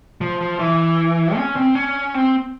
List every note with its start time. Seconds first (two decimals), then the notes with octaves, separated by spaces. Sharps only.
0.21 F3
0.40 F3
0.59 E3
1.37 C#4
1.56 C4
1.75 C#4
2.14 C4